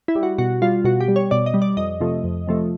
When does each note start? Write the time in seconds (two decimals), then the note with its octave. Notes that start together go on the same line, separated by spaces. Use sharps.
0.08 E4
0.15 G3
0.23 F#4
0.38 B2 F#4
0.62 G3 F4
0.84 B2 F#4
1.00 G4
1.08 G3
1.16 C#5
1.31 B2 D5
1.46 D#5
1.54 G3
1.62 D5
1.77 F2 D#5
2.00 C3 F3 A3
2.24 F2
2.47 C3 F3 A3